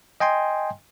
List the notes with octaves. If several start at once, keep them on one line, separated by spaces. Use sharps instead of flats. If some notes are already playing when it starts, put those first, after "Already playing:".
D#5 G5 G#5 C6